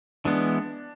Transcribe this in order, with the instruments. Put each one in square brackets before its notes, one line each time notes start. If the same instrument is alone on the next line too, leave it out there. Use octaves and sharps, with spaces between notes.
[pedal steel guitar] E3 G#3 B3 [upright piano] D4